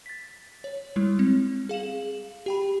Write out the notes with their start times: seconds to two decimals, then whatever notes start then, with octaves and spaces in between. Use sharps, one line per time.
0.06 A6 B6
0.64 C#5
0.96 G3 G#3 E4
1.19 C4
1.69 G#4 F5 E7 F#7
2.46 G4 G5 B5